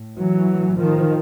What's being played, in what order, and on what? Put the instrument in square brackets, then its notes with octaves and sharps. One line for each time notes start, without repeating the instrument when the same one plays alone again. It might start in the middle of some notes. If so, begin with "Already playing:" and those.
Already playing: [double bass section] A2
E3 F#3
A2
D#3 F3